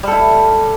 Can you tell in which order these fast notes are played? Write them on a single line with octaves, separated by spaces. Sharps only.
G3 A4 E4